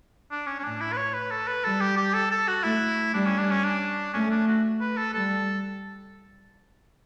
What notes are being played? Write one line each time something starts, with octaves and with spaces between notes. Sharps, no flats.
D4
C#4
C#4
A2 D4
E4
B4
C#5
B4
A4
B4
G3 A4
G4
G4
A4
A4
F#4
A3 E4
G3 D4
C#4
D4
C#4
D4
A3 C#4
D4
F#4
B4
A4
G3 A4